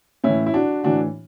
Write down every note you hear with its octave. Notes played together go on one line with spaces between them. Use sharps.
A2 E3 C#4 E4
E4
D4 F#4
A2 E3 D4 F#4